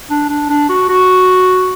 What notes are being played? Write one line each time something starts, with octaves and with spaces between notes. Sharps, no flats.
D4
D4
D4
F#4
F#4